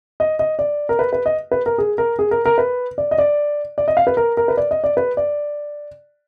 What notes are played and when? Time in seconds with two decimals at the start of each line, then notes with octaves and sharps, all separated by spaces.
0.20 D#5
0.39 D#5
0.59 D5
0.89 A#4
0.99 B4
1.13 B4
1.26 D#5
1.52 B4
1.66 A#4
1.78 G#4
1.98 A#4
2.19 G#4
2.31 A#4
2.46 A#4
2.58 B4
2.98 D5
3.11 D#5
3.18 D5
3.78 D5
3.88 D#5
3.97 F5
4.07 B4
4.17 A#4
4.37 A#4
4.48 B4
4.57 D5
4.71 D#5
4.84 D5
4.97 B4
5.17 D5